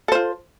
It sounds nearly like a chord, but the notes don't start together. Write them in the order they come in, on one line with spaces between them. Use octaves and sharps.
A4 C5 F4